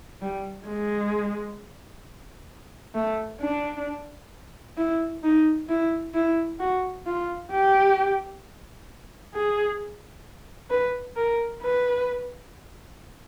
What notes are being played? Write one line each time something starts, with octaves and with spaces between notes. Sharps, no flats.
G3
G#3
A3
D4
E4
D#4
E4
E4
F#4
F4
G4
G#4
B4
A#4
B4